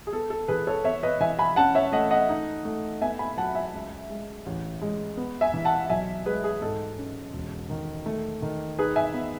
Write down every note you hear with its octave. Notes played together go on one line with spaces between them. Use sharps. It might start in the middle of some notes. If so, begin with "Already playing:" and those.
G#4
B3 A4
A4
E3 G#4 B4
A4 C#5
B3 C#5 E5
B4 D#5
E3 E5 G#5
G#5 B5
C#4 F#5 A5
C#5 E5
A3 D#5 F#5
D#5 F#5
D#4
A3
B3 E5 G#5
G#5 B5
F#3 F#5 A5
E5 G#5
C#2
G#3
A1
G#3
B3
E5 G#5
E3
F#5 A5
B1 E5 G#5
G#3 G#4 B4
G#4
G#2 A4
C#4
E1
D#3
A3
D#3
D#4 G#4 B4
E5 G#5
B3